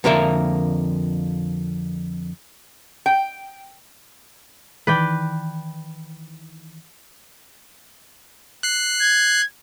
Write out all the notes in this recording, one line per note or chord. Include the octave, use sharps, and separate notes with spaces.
F2 D3 A#3 A#4 E5
G5
D#3 E3 B4 D5 G5
F#6 C7
G#6